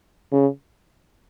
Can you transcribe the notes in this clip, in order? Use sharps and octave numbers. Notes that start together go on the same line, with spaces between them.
C#3